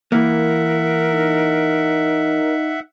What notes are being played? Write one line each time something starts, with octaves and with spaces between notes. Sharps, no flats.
E3 A#3 A#4 E5 F#5
D#4